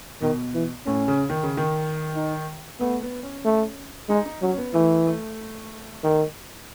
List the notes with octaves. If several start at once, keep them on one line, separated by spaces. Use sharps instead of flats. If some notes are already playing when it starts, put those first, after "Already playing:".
B2 D#3
E3
A2 C#4
C#3
D#3
C#3
D#3
D#4
A3 B3
B3
C#4
A3
G#3 D#4
D#4
F#3 C#4
C#4
B3
E3 A3
A3
D#3